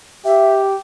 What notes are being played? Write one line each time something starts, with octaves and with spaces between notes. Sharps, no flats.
G4 E5